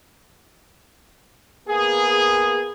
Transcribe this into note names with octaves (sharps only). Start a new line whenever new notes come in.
A#3 B3 G#4